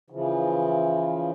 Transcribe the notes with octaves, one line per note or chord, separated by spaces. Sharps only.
C#3 E3 F3